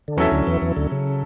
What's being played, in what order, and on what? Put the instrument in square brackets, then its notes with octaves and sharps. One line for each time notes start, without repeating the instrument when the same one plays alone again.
[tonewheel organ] D3
[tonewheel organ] E2 E3 [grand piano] F#3 C#4 E4 A4 E5
[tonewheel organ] D2 D3
E2 E3
E2 E3
D2 D3
C#3